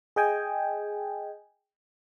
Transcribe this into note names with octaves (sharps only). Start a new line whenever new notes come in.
G#4 D#5 G5 G#5